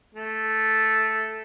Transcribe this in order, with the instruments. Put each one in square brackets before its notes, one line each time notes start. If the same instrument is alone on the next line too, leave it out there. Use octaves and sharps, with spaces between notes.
[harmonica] A3